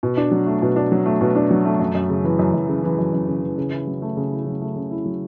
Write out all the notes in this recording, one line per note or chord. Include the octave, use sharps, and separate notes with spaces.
B2
D4
F#3
A3
B2
D4
F#3
A3
B2
D4
F#3
A3
F#2
F#2
C#3
E3
F#2
F#2
C#3
E3
F#2
F#2
C#3
E3
C#3
E4
F#3
A3
C#3
E4
F#3
A3
C#3
E4
F#3